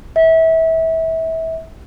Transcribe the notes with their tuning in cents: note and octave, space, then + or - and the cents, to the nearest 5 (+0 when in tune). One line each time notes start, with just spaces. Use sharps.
E5 -25